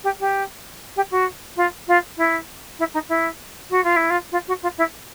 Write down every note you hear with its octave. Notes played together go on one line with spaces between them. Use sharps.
G4
G4
G4
F#4
F4
F4
E4
E4
D#4
E4
F#4
F4
E4
F4
F4
F#4
F4
E4